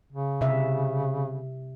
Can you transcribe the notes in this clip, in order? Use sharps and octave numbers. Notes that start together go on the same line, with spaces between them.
C#3
C3 E5